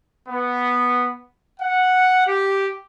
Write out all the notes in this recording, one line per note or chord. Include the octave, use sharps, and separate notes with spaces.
B3
F#5
G4